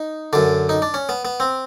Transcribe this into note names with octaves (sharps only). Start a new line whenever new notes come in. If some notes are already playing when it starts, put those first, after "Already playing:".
Already playing: D#4
F#2 D3 D4
D#4
D4
C#4
B3
B3
C4